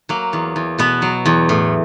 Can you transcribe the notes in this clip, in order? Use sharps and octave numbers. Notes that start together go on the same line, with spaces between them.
F#3 A#3
E2
E2
B2 B3
F#3
E2
A2